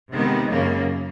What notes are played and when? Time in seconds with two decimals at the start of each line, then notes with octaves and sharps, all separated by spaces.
0.12 C3 D#3 G#3 B3 D#4
0.50 F#2 C#3 F#3 A#3